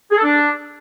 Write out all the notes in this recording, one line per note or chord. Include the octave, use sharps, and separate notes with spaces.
G#4
A4
D4